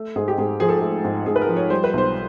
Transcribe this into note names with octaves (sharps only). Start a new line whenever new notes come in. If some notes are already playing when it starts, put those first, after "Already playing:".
Already playing: A3
G#2 G#4
G4
G#2 G#4
F3 G#4
A4
A3 G#4
G#2
G#2 G#4
B4
A#4
F3
C#5
G3 C5
B4
B1 C5